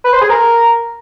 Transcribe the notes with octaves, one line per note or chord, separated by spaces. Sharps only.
B4
C5
G#4
A#4